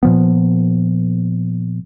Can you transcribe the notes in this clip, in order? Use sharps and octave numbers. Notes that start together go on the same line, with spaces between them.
A#2 F3 B3